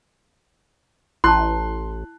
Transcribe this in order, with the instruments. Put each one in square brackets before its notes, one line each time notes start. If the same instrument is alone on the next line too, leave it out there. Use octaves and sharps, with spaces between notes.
[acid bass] A1 [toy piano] E4 A5 [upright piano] C6 F#6